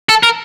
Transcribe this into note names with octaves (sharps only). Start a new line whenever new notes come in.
A4
A#4